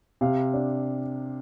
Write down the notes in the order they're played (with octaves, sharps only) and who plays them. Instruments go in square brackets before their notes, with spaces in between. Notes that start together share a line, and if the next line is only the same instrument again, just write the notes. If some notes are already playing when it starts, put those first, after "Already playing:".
[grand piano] C3 F5
D4